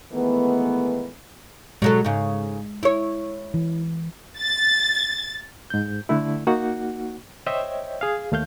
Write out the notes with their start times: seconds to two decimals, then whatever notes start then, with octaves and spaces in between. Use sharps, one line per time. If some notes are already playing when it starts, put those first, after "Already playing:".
0.13 D#3 E3 G#3 A3 B3
1.82 B2 F#3 G#3 A4
2.05 G#2 C#3
2.83 E4 C#5
3.54 E3
4.39 A6
5.70 G#2 G6
6.09 D3 A3 E4
6.47 A#3 D#4 F#4 F#5
7.46 C5 C#5 D#5 E5 G5
8.01 G#4 F5
8.32 D#2 A3 F5 G6